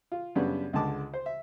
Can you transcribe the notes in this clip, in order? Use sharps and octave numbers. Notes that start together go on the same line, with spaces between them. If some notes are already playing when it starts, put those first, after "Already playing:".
F4
F#2 C#3 G3 B3 D4
C#2 D3 G#3 A5 D6
C5
E5